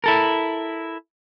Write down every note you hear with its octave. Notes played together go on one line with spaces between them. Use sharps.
E4 A4 A#4